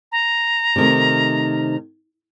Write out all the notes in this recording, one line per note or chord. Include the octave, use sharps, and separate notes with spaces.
A#5
C3 D#3 A3